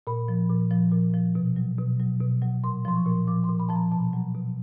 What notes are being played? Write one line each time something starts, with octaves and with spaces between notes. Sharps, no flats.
A#2 B5
F3
A#2
F3
A#2
F3
B2
F#3
B2
F#3
B2
F#3
A#2 C6
F3 C6
C#6
A#2
F3 D6
C6
A#2
B5
F3 A5
A#5
B2 A5
F#3
B2